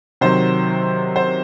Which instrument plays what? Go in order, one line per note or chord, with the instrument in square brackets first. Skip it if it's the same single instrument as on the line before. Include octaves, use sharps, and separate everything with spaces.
[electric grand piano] C3 D#3 F#3 [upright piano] C5
[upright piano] C5